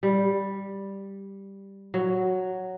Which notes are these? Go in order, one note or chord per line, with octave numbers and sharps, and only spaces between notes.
G3
F#3